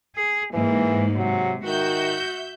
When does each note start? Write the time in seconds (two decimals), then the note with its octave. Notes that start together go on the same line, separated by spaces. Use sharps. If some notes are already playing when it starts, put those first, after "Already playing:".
0.16 G#4
0.54 G#2 E3 A#3
1.16 C3 F#3
1.65 D#3 F#4 E5 G6